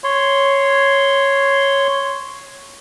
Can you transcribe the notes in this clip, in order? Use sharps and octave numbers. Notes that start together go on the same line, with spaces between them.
C#5 C6